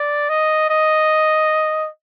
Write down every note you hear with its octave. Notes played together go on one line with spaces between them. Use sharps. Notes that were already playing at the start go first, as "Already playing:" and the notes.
Already playing: D5
D#5
D#5